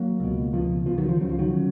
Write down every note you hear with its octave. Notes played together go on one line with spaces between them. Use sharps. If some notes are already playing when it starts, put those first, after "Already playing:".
Already playing: F#3 A#3
C#2 B2
C#2 B2 F3
C#2 B2 F3
D#3 F#3
F3
C#2 C#3 F#3
F3
D#3 F#3
C#3